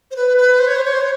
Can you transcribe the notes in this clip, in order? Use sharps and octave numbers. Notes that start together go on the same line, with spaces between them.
C5
B4
B4
C5
C#5
C5
C#5
C5
C#5